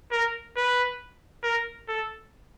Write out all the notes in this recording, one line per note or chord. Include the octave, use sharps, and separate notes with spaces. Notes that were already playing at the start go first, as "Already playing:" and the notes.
A#4
B4
A#4
A4